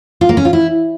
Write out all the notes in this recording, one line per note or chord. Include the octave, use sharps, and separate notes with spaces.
F4
A#3
C#4
F4
E4